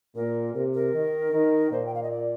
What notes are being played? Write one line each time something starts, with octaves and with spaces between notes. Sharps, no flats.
A#2 A#4
C3 A#4
A#4
D#3
D#3
A#2 C5
G5
F5
D#5
D5